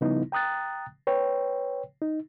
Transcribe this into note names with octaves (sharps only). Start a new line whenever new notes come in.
C#3 F3 G3 B3 D#4 E4
G5 A#5 D#6 F#6 A6
B4 C#5 G5
D#4